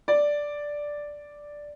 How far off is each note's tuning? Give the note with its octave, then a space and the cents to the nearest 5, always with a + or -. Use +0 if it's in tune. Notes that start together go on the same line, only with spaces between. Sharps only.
D5 +0